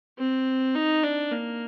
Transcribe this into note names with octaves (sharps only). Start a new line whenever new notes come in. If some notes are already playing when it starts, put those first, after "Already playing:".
C4
D#4
D4
A#3